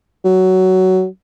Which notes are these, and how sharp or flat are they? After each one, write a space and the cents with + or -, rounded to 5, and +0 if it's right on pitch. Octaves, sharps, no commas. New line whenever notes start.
F#3 +15